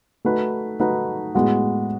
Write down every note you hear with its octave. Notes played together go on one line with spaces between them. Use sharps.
A3 D#4 F#4 B4
A3 D#4 F#4 B4
A2 G#3 B3 F#4